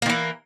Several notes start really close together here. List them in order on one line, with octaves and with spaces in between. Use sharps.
A#3 D#3 E3